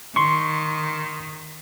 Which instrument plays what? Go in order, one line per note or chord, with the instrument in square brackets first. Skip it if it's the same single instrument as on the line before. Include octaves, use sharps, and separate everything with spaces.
[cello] D#3 [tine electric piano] C6 C#6